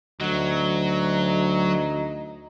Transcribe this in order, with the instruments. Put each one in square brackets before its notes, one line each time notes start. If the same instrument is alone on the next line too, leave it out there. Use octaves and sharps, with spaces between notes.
[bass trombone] D2 [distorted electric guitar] F#3 [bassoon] D#4